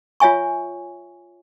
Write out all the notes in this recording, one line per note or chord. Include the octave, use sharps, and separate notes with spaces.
F4 C#5 E5 G#5 C#6